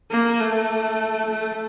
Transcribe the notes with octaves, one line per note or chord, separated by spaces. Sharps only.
A#3
A3
A3